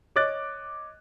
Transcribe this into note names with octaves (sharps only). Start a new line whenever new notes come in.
C#5 D#5 D6 F#6 A6